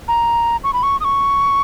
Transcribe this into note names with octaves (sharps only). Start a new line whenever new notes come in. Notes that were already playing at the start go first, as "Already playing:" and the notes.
A#5
C#6
B5
C#6
D#6
C#6